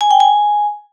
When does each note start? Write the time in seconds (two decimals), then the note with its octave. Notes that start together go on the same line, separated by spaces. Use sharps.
0.01 G#5
0.11 G5
0.20 G#5